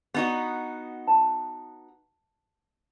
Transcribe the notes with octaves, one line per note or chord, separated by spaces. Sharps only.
B3 D#4 F#4
A5